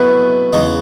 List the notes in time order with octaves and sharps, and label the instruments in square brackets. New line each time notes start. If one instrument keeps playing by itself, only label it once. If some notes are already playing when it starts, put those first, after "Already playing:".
Already playing: [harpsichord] B2 F#3 A3 E4 [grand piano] B3 B4
[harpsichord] E2 C#3 G#3 D#4